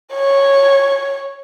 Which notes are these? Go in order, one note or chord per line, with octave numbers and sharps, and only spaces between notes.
C#5